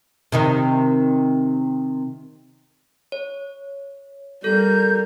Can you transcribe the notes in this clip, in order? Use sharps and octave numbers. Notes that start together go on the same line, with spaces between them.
C3 D#3 D#4
C#5
G3 A4 A#4 G6